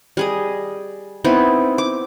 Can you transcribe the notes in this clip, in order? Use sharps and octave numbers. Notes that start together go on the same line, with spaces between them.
G3 G#4 D#5
B3 C4 D#4 E4
D6